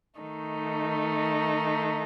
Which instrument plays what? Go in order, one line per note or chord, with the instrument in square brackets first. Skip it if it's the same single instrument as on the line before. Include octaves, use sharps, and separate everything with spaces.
[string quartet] D#3 A3 D#4